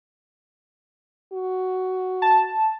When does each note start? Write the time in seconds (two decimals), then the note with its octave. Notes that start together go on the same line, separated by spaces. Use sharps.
1.33 F#4
2.22 A5